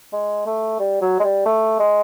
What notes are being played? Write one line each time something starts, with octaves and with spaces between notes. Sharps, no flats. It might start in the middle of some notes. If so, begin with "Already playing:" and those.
G#3
A3
G3
F#3
G#3
G3
A3
G#3